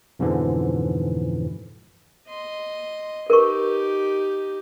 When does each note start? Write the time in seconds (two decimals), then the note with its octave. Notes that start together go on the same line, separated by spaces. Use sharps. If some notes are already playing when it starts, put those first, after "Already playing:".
0.19 F2 G#2 B2 D3 E3 F3
2.28 D#5 C6
3.30 D#4 G4 A#4 B4 C#6